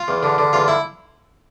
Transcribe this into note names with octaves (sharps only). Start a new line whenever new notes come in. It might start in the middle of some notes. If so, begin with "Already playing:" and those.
Already playing: F4 F5
E2
D3
D3
E2 F4 F5
E4 E5